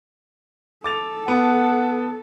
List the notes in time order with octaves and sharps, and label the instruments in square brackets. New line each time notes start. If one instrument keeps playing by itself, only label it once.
[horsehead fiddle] A4 [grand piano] D6 A6 F7
[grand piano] B3 [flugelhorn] F#5